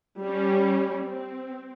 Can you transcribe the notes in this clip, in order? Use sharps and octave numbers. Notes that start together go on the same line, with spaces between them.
G3 C#4
C4